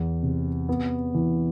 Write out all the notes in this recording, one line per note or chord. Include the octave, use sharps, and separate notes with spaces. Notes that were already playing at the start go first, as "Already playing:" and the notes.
Already playing: E2
C3
B3
E3